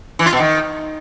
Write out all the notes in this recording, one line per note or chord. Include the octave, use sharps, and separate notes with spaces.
E3
F4
B2
D#3